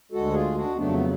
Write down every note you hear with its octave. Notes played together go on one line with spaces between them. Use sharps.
D2 D3 G#3 F#4 A4
F4 G#4
D4 F#4
F2 C#3 F#3 A3 B3 D4
B3